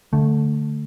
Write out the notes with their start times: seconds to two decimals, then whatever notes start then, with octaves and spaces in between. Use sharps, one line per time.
0.13 D3 A3